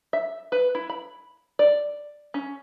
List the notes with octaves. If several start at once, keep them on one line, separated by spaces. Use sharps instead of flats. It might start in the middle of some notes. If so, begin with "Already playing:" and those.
E5
B4
E4
B5
D5
C#4